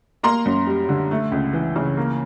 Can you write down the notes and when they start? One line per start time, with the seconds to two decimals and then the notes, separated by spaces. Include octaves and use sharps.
0.23 A#3 A#5 C6
0.46 F#2
0.67 G3
0.89 D3
1.11 A3
1.32 C#2
1.53 E3
1.76 C#3
1.97 A#3